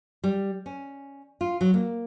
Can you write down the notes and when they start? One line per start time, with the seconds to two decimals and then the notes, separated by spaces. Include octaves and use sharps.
0.24 G3
0.66 C#4
1.41 F4
1.61 F#3
1.74 A#3